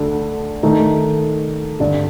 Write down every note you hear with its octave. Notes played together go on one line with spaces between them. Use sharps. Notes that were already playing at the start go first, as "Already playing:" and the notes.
Already playing: D2 D3 A3 D4 A4
D#3 A3 D#4
G2 D3 G3